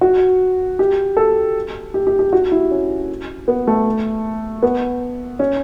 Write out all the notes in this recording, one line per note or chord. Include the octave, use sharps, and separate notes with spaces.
F#4
G4
A4
G4
G4
G4
F#4
E4
C#4
B3
A3
B3
C#4